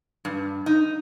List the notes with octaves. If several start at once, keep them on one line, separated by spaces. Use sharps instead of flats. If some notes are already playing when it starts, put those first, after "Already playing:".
G2
D#4